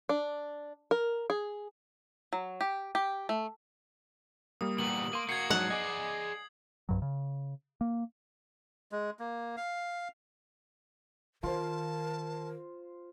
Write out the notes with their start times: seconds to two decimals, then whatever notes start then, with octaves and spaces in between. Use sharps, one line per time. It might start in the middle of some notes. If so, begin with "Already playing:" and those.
0.09 D4
0.91 A#4
1.30 G#4
2.33 F#3
2.61 G4
2.95 G4
3.29 A3
4.61 G3 A#3 D#6
4.78 A#2 E3 B3 F#7
5.13 A#3 C6 D#7
5.29 A#3 F#4 G#6 C7 C#7
5.50 G#2 F#3 D4 F#5
5.70 G#4 D5 D#5 G#5 D6
6.89 C2 G2 F#3
7.02 C#3
7.81 A#3
8.92 G#3
9.19 A#3
9.57 F5
11.43 D3 D#3 F4 A#4 C5 A5